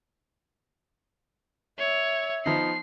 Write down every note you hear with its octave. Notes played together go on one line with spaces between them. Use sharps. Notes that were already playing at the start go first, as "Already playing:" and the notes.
C#5 E5
F3 B3 D#4 C7